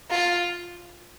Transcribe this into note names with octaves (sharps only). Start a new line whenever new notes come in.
F4